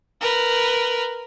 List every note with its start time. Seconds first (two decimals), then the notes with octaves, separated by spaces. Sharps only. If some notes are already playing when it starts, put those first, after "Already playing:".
0.21 A#4 B4